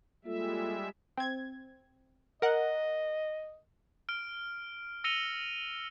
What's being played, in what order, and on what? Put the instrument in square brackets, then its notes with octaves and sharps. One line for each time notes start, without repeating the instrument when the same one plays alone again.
[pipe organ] G3 G#3 E5 [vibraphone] A#3 F4 A4
[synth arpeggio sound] C4 G#6
[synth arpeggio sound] A#4 F#5 [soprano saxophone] D#5
[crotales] F6 D7
E6 A#6 C#7 D#7 F7 G7